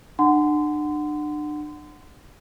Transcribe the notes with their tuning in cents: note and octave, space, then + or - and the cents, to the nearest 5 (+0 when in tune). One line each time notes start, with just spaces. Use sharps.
D4 +40 F#5 +0 C6 -30